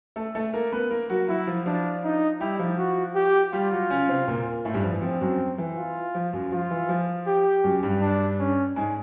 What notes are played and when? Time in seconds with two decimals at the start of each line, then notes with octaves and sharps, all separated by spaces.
0.16 A3 A4
0.35 A3 A4
0.53 A#3 A#4
0.72 B3 B4
0.91 A#3 A#4
1.10 F#3 F#4
1.28 F#3 E4 F#4
1.47 F3 F4
1.66 F3 D4 F4
2.04 D#4
2.40 G3 E4 G4
2.59 F3 F4
2.78 F#4
3.15 G4
3.53 G3 F4 G4
3.71 F#3 F#4
3.90 C#3 C#4
4.09 C3 C4
4.28 A#2 A#3
4.65 A2 A3
4.74 G2 G3
4.84 F3
4.93 E3
5.02 F3 C4
5.21 F#2 F#3
5.58 E3
5.77 F4
6.15 F3
6.33 F#2 F#3
6.52 F3 F4
6.71 E3
6.89 F3
7.27 G4
7.64 F#2 F#3
7.83 G2 G3
8.01 D4
8.39 C#4
8.76 G#2 G#3